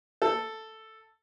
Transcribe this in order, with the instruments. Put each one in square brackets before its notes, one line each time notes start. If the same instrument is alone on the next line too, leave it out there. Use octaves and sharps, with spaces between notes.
[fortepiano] A4